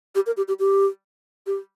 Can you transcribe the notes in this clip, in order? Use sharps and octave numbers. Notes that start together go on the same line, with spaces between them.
G4
A#4
G4
G4
G4
G4